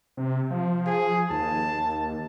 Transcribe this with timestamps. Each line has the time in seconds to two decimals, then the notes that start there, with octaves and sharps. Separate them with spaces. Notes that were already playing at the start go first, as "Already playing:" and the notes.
0.17 C3
0.50 F3
0.86 G#4
1.30 D#2 A5